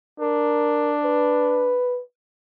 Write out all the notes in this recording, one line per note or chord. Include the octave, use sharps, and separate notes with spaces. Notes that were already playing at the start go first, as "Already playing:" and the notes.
D4 A#4
B4